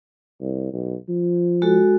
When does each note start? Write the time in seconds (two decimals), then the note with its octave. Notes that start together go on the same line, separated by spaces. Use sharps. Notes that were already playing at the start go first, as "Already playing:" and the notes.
0.40 C2
0.73 B1
1.08 F3
1.62 G#3 F#4 A4